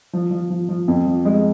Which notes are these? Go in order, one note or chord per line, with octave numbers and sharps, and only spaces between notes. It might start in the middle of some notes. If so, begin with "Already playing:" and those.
F3
F3
F3
F3
F2
F3
G#3